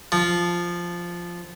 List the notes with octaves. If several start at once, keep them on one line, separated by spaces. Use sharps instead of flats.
F3